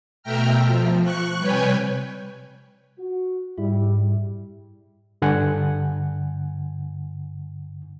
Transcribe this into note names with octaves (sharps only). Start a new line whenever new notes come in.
B2 A3 E5 G5 A#5 F6
F3
C#6 F#6
C3 G3 B4 C#5 G5 G#5
F#4
G#2 G3 E4
G2 D3 F#5 G#5